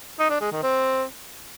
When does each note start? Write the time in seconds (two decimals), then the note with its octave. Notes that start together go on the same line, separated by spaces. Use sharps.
0.19 D#4
0.30 D4
0.41 G#3
0.52 D#3
0.63 C4